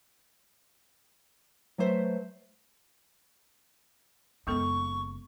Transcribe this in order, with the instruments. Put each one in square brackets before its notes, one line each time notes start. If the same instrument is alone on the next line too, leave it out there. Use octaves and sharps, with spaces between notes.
[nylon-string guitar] F#3 A3 B4 C5 E5
[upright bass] F#1 E4 [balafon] G#3 B3 A4 [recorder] C#6